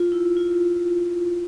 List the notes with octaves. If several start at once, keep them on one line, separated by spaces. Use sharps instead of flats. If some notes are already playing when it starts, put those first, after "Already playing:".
Already playing: F4
E4
F4